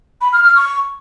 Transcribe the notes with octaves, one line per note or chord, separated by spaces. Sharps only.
B5
F6
F6
C#6